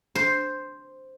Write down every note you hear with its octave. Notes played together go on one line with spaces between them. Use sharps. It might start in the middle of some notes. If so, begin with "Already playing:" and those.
C5